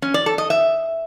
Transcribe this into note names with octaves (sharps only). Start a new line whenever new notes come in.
C#4
D5
A4
D#5
E5